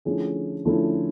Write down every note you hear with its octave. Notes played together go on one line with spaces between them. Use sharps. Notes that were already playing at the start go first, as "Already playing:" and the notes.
D3 F3 A3 C#4 E4 G#4
D3 F3 A3 C#4 E4